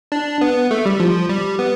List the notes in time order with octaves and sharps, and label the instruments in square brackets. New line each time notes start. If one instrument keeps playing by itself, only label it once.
[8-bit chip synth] D4
B3
A3
G3
F3
G3
B3